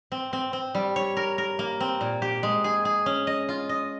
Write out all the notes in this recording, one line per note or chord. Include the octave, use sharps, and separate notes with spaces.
C4
C4
C4
G3
C#5
A#4
A#4
A#3
C4
A#2
G4
G#3
G#4
G#4
C#4
D#5
F4
D#5